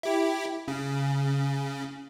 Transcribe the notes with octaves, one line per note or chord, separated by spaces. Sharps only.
E4 G4
C#3